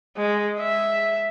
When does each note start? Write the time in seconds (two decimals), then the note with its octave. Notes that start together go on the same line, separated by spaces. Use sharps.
0.17 G#3
0.60 E5